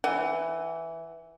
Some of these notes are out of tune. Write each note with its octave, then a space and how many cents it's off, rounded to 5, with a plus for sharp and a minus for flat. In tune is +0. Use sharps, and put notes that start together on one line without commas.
E3 +0 F#5 +30